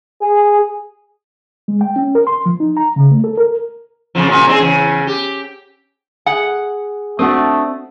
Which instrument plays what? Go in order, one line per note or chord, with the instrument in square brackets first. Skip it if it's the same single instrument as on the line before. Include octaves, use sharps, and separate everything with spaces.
[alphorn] G#4
[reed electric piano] G#3
G5
C#4
A#4
C6
F3
D#4
A#5
C#3
A3
A4
A#4
[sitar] F2 C#3 F3
A#2 C#3 F#4
C4 D4 G#4
E2 C#3
G4
[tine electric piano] G#4 [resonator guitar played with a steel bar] F#5
[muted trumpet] A3 [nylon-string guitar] C4 D4 F#4 [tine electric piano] D#6